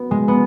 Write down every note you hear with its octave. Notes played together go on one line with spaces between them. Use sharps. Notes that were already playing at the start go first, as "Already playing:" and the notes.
Already playing: B3 F#4
G#3
B3